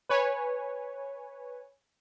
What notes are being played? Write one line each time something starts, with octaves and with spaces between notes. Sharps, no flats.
B4 C#5 G#5